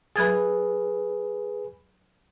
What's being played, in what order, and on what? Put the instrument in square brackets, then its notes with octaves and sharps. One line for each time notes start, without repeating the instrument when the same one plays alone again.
[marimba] F#3 G#6 A6 [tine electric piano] G#4 B4